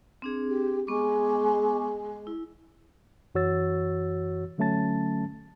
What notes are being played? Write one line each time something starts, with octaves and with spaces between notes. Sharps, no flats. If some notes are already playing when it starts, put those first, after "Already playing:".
C4 D4 G#4
G4
G#3 B3 C#6 D6
E4
F#2 E3 F#4 C#5 E6 A6
D3 F#3 A3 C#4 A5 A6